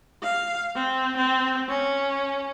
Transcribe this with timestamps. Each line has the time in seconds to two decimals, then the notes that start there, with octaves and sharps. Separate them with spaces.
0.23 F5
0.75 C4
1.17 C4
1.69 C#4